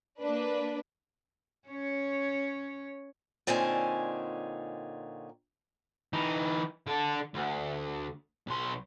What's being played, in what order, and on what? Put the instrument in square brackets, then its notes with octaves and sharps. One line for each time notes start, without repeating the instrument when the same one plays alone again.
[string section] A#3 D4 B4
[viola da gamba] C#4 C#5
[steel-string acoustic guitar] A#2 D3 C4 C#4 D#4 G#5
[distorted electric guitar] E3 D#4
D3 A4
D2
B1 C6